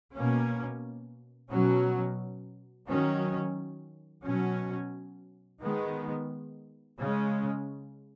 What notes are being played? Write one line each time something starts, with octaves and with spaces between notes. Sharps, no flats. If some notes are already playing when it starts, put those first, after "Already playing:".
B2 A#3 C#4
B2 F#3 C#4
D#3 F#3 C#4
B2 F#3 C#4
D#3 G#3 B3
C#3 G#3 C#4